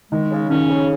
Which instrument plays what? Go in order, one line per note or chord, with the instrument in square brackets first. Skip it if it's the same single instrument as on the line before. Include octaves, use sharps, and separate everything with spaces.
[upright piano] D#3 [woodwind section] G#3
[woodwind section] C#3
[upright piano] D#3 [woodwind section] C#4
[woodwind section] C#3